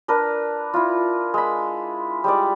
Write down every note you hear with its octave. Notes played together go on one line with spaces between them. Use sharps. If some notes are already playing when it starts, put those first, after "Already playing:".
D4 A#4 B4
E4 F4
G#3 B5
G3 G#3 D5